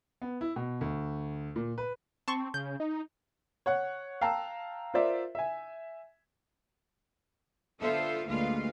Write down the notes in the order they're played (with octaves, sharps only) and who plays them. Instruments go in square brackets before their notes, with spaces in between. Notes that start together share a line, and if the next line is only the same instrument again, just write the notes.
[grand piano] B3
E4
B2
D2
A#2
B4
[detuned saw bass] C4 [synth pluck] A5 C6 C#6
[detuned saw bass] C#3 [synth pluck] G6
[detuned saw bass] D#4
[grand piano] C#5 F#5 F#6
F5 G5 A5 A#5 E6
F4 A#4 C5 D5 E5
E5 G#5
[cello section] D3 B3 F4 A4 C5 E5
D2 A#2 G#3 F4 B4 F5